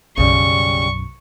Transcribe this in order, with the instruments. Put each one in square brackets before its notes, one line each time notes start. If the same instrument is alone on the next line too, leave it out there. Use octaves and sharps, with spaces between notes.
[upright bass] B1 F#2 [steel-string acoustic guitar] C#3 G3 [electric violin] C#6